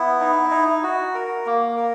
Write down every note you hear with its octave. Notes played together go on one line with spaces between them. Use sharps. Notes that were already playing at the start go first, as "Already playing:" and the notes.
Already playing: B3 E4
D#4
D#4
F#4
A#4
A#3
A#4